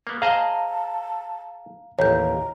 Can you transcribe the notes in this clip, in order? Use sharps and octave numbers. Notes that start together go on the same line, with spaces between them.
A#3 B3
G#4 C5 D#5 F5 A5 A#5
A1 D#2 C#5 A#5 G6